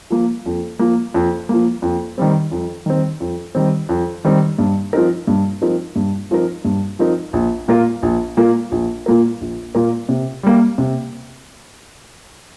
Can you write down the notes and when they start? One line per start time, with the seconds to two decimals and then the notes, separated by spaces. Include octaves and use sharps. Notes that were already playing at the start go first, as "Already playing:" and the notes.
0.10 F3 A#3
0.46 F2
0.79 F3 A#3
1.14 F2
1.49 F3 A#3
1.82 F2
2.18 D#3 G3 C4
2.52 F2
2.86 D#3 G3 C4
3.20 F2
3.55 D#3 G3 C4
3.89 F2
4.25 D#3 G3 C4
4.59 G2
4.93 F3 C4 D#4 A#4
5.27 G2
5.61 F3 C4 D#4 A#4
5.96 G2
6.31 F3 C4 D#4 A#4
6.65 G2
6.99 F3 C4 D#4 A#4
7.33 A#1
7.68 A#2 A#3 F4 A#4
8.02 A#1
8.37 A#2 A#3 F4 A#4
8.71 A#1
9.06 A#2 A#3 F4 A#4
9.41 A#1
9.75 A#2 A#3 F4 A#4
10.09 C3
10.43 G3 A#3
10.78 C3